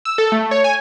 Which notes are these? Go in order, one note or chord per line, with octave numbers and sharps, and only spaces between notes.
E6
A4
A3
C#5
G#5